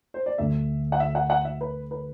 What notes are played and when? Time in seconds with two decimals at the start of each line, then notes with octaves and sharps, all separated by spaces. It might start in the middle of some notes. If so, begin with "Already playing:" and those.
0.14 C5
0.26 D5
0.38 D2 D3 A3 E5
0.92 F#5
1.00 E5
1.15 F#5
1.30 F#5
1.45 E5
1.61 B4
1.91 B4